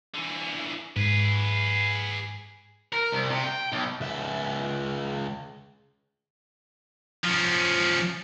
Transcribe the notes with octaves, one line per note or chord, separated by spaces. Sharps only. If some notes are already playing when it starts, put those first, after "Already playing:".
D3 E3
G#2 G#4 B4
A#4
C2
C3
G5
B1
C#2 E5
F3 C#4